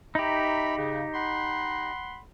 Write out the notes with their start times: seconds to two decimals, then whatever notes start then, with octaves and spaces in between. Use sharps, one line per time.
0.15 D#4 G4 E5 A#5 B5
0.77 C#3
1.13 F#5 B5 C6